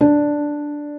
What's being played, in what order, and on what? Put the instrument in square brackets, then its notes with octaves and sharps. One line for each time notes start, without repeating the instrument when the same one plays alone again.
[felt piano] D4